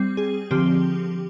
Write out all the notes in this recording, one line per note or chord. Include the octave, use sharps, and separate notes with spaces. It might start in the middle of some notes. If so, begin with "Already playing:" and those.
Already playing: G3 C4
G#4
D3 F3 C4 G4